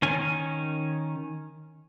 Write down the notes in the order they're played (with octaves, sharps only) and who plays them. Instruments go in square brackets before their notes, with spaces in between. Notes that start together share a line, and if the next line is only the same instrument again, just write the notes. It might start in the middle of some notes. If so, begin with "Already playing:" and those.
[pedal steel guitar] D#3 C#4 G#5